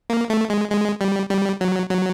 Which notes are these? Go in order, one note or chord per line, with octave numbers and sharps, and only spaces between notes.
A#3
A3
G#3
G#3
G3
G3
F#3
F#3